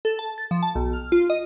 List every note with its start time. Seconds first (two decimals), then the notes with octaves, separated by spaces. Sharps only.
0.05 A4
0.19 A5
0.38 A6
0.51 F3
0.63 A5
0.75 B1
0.93 F6
1.12 F4
1.30 D#5